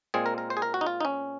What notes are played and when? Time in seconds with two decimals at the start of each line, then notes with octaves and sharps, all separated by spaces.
0.14 A#2 G#3 C4 G#4
0.26 A#4
0.38 A#4
0.50 C5
0.57 G#4
0.62 A#4
0.74 F#4
0.81 D#4
0.86 F4
1.00 D#4
1.05 C#4